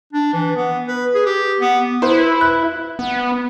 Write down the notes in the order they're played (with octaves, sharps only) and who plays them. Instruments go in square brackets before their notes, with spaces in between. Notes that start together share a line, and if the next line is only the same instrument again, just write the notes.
[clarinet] D4
E3
B3
B4
G#4
G4
B3
[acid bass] E4 [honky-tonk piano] B4 C5
[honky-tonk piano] F#6
[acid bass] B3